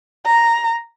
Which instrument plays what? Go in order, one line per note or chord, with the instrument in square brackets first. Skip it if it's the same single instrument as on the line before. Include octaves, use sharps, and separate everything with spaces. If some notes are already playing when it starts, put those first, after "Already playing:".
[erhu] A#5